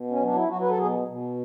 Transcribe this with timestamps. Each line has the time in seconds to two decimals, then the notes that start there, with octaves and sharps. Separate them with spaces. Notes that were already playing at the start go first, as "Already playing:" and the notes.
Already playing: B2
0.11 C#4
0.20 F#3 D4
0.36 E4
0.48 F#3 F#4
0.61 B4
0.70 A4
0.77 B2 G#4
1.08 B2